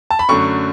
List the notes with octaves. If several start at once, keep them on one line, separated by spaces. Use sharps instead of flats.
A5
B5
F#2 D3 F#3 A3 C#6